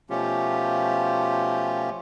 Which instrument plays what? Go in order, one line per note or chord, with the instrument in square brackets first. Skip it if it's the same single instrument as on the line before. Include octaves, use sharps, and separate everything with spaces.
[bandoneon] B2 F3 A3 C#4 F4 G4